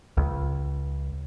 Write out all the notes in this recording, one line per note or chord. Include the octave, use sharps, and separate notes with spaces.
C#2